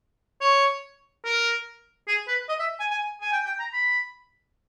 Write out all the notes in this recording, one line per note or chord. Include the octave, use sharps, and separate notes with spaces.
C#5
A#4
G#4
B4
D#5
E5
G#5
G#5
G#5
G5
G5
A#5
B5